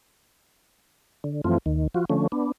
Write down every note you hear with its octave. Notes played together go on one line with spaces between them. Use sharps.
D3
F#2 E3 F3 A3 C4 F4
D#2 D#3
F3 F4 F#4
D3 F3 A3 C#4
B3 D4